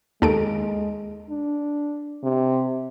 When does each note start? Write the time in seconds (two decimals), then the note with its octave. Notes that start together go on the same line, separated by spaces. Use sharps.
0.22 D#2 G#3 A4 D7
1.30 D4
2.24 C3